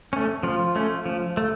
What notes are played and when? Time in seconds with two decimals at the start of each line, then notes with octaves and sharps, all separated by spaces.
0.13 A3 C#4
0.43 F3 F4
0.76 A3 C#4
1.06 F3
1.37 A3